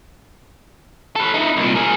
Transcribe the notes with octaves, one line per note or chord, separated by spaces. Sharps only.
A4 B4
D#4 E4
C2 A#2
G#4 A#4